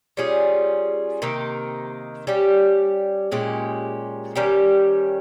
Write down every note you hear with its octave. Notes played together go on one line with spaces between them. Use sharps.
G3 C#4 F4 G#4
C3 D#3 A#3 D#4
G3 C#4 G4
A#2 G#3 C#4 G4
D#3 G3 C#4 G4